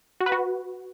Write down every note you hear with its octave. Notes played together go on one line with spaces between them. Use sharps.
F#4
B4
F#4